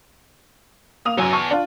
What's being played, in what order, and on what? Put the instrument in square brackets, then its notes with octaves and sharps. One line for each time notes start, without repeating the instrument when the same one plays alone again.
[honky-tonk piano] A#3 D#6 F7
[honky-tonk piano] F#2 F#3 [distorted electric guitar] B3 G#5
[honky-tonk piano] A5 C#6
D4 F4